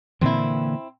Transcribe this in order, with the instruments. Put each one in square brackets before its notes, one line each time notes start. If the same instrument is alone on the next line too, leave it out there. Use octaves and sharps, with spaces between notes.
[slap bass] A#2 D3 E3 [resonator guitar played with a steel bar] C4 E4